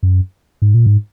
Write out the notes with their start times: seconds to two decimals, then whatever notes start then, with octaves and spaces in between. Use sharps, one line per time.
0.03 F#2
0.62 G#2
0.74 A#2
0.86 G#2